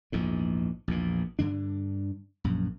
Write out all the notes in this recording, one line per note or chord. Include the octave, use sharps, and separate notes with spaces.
A#1 E2 G#2
A#1 E2 A#2
G2 D3 D4
A#1 F#2